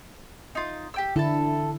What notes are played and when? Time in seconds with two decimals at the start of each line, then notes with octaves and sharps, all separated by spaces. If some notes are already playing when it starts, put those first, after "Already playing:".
0.55 D#4 F4
0.94 G4 G5 E6
1.16 D3 D4 E4 A4 A5